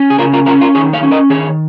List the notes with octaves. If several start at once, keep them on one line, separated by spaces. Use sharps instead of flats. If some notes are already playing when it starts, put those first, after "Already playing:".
Already playing: C#4
G#4
C#3 F4 A#4
F4 A#4
C#4 F4 A#4
F4 A#4
D#3 G#4 C#5
C#5 F5
C#4
A#4 D#5
D#3 G#4 C#5